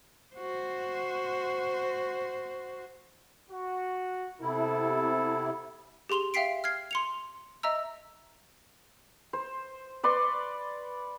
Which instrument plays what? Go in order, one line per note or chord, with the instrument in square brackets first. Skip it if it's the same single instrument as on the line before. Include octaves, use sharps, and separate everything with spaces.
[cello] F#4 C5
[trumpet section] F#4
[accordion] C3 E4 [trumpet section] B3 A4
[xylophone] G4 G#4 C6 F7 G7
E5 F5 G5 B6 C7 D7
F6 G#6 C7
C6 C#7 F7
D#5 E5 A#5 E6
[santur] C5
B4 D5 C6 C#6